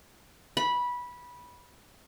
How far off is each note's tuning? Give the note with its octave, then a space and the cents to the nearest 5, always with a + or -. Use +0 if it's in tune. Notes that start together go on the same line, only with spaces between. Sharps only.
B5 -15